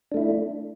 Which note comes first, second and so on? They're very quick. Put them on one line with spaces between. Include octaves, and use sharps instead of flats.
D4 A3 E4